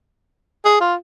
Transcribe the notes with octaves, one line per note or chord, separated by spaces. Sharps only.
G#4
F4